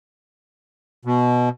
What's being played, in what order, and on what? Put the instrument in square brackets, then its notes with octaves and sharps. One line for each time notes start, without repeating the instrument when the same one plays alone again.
[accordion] B2